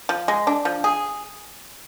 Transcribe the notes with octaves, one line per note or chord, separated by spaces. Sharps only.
F3
G#3
D4
F3
G#4